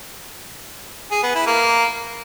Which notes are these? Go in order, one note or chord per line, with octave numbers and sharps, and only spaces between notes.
G#4
B3
E4
A#3